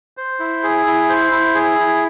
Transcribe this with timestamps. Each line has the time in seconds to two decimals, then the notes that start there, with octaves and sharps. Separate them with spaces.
0.17 C5
0.40 E4
0.63 G#4
0.86 E4
1.09 C5
1.31 E4
1.54 G#4
1.78 E4